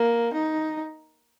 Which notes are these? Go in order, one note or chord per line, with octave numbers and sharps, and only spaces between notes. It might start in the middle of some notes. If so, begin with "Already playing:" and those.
Already playing: A#3
D#4